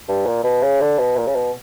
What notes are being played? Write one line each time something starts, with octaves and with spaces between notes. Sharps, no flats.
G2
A#2
B2
C#3
D3
B2
A#2
C#3
B2